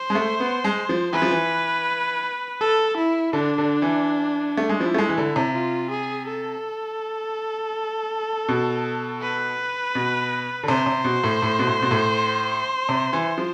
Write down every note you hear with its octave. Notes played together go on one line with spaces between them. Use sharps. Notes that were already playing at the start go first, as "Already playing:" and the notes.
Already playing: C5
G#3
A3
B3
G#3
F3
E3 B4
F3
E3
A4
E4
D3 D4
D3
E3
A3
G#3
F3 E4
A3
G#3
E3
D3
C3
F4
G#4
A4
B2
B4
B2
D3
C3 C5
C3
B2
A2
A2
B2
A2
B2
A2
C3
E3
F3